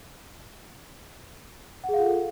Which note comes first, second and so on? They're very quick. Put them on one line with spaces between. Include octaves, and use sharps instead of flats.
F#5 G#4 F5 F4 A4